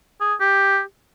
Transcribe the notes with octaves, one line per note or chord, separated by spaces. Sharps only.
G#4
G4